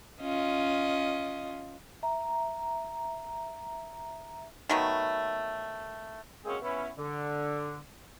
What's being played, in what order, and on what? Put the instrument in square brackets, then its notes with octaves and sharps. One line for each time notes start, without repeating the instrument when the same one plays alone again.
[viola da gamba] C#4 F4 D#5
[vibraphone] E5 A#5
[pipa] D#3 F#3 A3 B3
[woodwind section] G#3 A#3 C4 C#4 F#4 G#4
B3 C#4 E4
D3